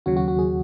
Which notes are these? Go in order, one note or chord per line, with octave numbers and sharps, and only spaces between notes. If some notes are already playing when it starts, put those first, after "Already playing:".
D#2 C#3 F#3 F#4
F#4
F#4
G#4